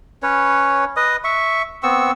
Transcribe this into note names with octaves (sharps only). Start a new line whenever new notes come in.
C#4 B4 C#5
B4 D#5 D#6
E5 C#6
B3 C4 C#6 E6